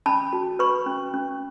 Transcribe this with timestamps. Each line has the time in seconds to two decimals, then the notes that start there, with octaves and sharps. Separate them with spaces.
0.06 C#4 A5 B5
0.33 F#4
0.59 B4 B5 C#6
0.86 C#4
1.14 C#4